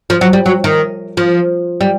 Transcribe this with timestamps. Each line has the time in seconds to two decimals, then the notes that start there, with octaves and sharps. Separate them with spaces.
0.10 F3
0.21 F#3
0.33 G3
0.46 F#3
0.64 D#3
1.17 F3
1.81 G3